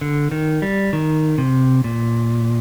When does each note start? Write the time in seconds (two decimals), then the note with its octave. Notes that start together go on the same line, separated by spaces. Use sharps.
0.01 D3
0.31 D#3
0.62 G3
0.93 D#3
1.38 C3
1.84 A#2